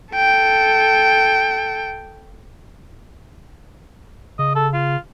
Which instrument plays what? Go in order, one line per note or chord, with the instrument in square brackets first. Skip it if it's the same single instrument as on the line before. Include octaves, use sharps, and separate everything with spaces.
[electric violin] A4 G5
[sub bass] C#3 [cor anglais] D#5
[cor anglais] A4
F4